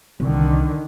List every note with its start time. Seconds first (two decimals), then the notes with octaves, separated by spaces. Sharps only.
0.20 C2 D3 D#3